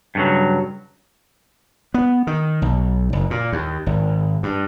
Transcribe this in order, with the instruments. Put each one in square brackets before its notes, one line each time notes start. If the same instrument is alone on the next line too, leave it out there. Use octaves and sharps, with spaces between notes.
[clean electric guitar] G2 C#3 F#3
[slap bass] B3
D#3
B1
F#1
A#2
D#2
G#1
G2